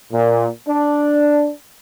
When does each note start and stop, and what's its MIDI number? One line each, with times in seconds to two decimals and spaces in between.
0.11 0.47 46
0.67 1.48 62